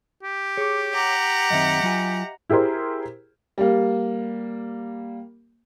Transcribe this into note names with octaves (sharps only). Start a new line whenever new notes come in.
G4
G#4 C#5 D6
F#5 A#5 D6
F#2 D#3 C4 D#5 E5
F#3 F4 G#5
E4 G4 G#4 A#4 C5
G3 A#3